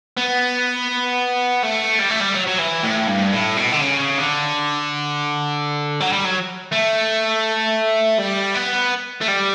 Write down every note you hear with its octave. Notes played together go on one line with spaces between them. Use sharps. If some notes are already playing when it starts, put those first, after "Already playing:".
B3
A3
G3
A3
G3
F#3
F#3
E3
A2
G2
A2
B2
D3
C#3
D3
F#3
G3
F#3
A3
G3
B3
A3
G3